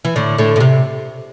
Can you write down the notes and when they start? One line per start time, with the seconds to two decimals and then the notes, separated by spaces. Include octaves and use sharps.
0.05 E3
0.16 A2 D3
0.38 A2 D3
0.56 A2
0.60 C3